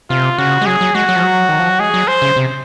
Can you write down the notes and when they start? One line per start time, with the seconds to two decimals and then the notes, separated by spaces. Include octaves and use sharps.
0.10 C3 F4
0.38 C#3 F#4
0.61 G#3
0.66 F#3 G#4
0.81 F#3
0.95 G#3 F#4
1.09 F#3
1.16 F3
1.23 F#3
1.49 D#3
1.59 F3
1.69 F#3
1.79 G#3 G#4
1.94 F#3
2.08 C5
2.22 C#3
2.36 C3